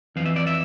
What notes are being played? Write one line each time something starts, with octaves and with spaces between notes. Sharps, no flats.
F2 E3 F5
E5
D5
E5